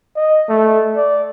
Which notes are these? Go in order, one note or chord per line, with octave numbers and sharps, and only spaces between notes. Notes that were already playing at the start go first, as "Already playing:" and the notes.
D#5
A3
D5